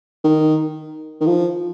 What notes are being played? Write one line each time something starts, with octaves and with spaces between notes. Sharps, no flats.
D#3
D#3
F3